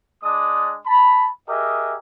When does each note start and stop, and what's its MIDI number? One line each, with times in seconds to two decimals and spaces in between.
0.23 0.77 56
0.23 0.77 62
0.23 0.77 74
0.23 0.77 87
0.86 1.29 81
0.86 1.29 83
1.49 1.95 67
1.49 1.95 68
1.49 1.95 70
1.49 1.95 75
1.49 1.95 76